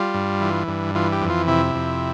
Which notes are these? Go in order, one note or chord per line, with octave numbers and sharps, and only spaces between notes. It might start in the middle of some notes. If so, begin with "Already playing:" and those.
Already playing: G3 F4
G2
E3
G2
E3 F4
G4
F2
F4
C3 E4
F2